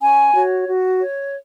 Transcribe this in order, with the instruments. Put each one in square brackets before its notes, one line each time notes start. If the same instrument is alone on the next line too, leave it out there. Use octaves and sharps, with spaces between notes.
[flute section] C#4 G#5
F#4 C#5
F#4
C#5